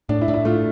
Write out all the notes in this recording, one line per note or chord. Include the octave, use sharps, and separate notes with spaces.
A2 D4
E4
A2
E4
A3 F4